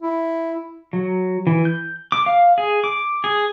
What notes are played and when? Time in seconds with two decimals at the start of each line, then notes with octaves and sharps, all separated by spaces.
0.02 E4
0.93 F#3
1.47 E3
1.65 G6
2.12 D6
2.26 F5
2.58 G#4
2.84 D6
3.24 G#4